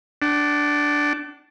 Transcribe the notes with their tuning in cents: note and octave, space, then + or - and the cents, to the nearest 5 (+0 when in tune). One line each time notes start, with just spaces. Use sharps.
D4 +0 F#5 +45